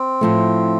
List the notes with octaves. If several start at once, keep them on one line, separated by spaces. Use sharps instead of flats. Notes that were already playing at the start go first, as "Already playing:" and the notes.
Already playing: C4
A2 F3 A3